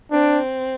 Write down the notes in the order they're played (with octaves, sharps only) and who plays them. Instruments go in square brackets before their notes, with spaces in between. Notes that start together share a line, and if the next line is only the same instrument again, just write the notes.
[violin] C4 [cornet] D4